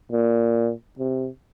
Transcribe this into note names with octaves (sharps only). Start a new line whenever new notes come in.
A#2
C3